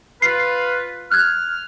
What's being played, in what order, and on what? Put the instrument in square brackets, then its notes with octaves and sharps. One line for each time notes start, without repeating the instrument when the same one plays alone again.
[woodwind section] F4 B4 [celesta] C7
[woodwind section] F6 [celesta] F#6 G#6